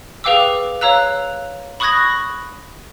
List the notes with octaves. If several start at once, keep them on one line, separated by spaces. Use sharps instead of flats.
G#4 B4 F5 G5 D6 E6
C#5 F5 A#5 E6 F#6
B5 C#6 D#6 F#6 G#6 A#6